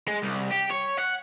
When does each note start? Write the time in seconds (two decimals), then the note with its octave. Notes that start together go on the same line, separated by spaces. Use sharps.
0.08 G#3
0.23 C2
0.52 G4
0.71 C#5
0.99 F#5